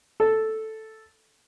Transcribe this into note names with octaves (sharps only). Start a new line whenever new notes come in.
A4